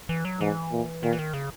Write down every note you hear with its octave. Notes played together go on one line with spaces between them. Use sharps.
E3
F#3
G#2 E3
A#2
A#2 D#3
E3
D#3
C#3